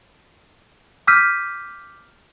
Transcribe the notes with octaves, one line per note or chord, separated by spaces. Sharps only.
D6 E6 F6 G6 B6 D#7